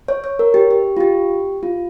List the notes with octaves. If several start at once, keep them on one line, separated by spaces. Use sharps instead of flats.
C#5
C#5
A#4
G4
G4
F4
G4
F4